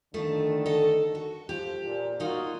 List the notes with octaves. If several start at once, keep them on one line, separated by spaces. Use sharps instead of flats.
D3 D#3 F3 A3
A4 D#5 A5
F#4
F3 G4
A#2
A#3 D#4 F4 F#4